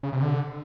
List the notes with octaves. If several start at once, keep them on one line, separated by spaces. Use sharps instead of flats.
C#3
C3
D3